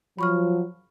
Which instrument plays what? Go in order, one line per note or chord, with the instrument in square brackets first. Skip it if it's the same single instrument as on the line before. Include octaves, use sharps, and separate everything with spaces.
[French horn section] F3 F#3 [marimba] B5 C#6 F6